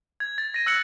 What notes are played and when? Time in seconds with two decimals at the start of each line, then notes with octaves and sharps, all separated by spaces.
0.20 G#6
0.38 A6
0.54 A#6 D#7
0.66 E6 F#6 C#7 F#7